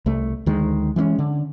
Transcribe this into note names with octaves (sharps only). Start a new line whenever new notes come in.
C2 A3
D2 D#3 G#3
E3 G#3 A#3 C#4
D3